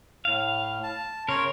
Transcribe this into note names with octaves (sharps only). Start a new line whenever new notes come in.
A2 F5
A5
C#3 A#4 C#5 C6